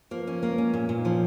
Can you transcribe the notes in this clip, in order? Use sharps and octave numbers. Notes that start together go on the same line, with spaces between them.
F3 A#3
C#4
G#3 A#3
C#4
A#2 A#3
A#2
D#4
F3 C#4